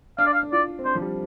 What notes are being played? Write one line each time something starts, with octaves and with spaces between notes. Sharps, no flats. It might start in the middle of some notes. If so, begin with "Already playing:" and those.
D4 F5
D5
F5
D4
F4 D5
C4
D4 C5
F3
G3